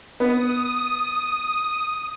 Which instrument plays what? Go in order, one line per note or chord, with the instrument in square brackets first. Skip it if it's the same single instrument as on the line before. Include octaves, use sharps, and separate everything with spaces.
[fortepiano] B3 [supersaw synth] D#6